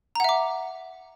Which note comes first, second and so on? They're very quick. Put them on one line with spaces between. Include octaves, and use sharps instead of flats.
A#5 F#5 E5 D6